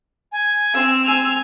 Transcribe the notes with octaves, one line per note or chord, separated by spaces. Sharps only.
G#5
C4 E6
G#5 F7